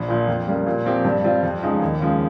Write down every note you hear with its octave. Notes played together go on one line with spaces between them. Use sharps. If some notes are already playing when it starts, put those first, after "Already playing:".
Already playing: A#1
A#2 F3
F2
C#3 G3 A#3
A#2
F3 C4 G4
G2
G3 C4 F4
F2
C#3 F3 G#3 D#4
D#2
C#3 F3 G#3